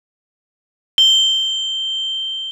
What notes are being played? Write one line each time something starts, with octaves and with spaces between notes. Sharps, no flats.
G7